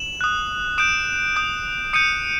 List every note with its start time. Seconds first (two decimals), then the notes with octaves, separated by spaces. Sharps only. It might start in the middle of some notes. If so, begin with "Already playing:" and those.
Already playing: E7 F#7
0.21 D#6 F#6
0.78 D#6 G6 D7 E7
1.36 D#6 G6
1.93 D#6 G6 C#7 D#7